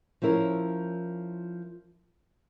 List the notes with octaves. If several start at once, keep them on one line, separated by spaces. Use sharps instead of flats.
F3 C#4 E4 A#4